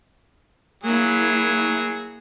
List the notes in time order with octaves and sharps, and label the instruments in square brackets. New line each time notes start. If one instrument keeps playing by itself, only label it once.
[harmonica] F#3 G#4 [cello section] A#3 E4